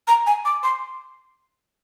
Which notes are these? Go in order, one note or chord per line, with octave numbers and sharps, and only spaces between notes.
A#5
G#5
D6
C6